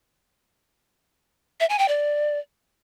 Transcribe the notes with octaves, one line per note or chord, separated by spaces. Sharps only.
E5
G#5
G5
D5